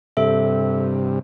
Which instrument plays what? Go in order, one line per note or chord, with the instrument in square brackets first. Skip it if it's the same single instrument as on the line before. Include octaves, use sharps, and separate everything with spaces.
[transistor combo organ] G2 C3 [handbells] A4 E5